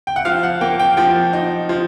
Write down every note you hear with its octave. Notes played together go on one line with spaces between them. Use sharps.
G5
F#5
F3 F5
F#5
A#3 G5
G5
F3 G5
D#4
F3